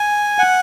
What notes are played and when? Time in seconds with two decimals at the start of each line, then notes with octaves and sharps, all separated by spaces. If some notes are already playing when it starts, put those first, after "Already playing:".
Already playing: G#5
0.39 F#5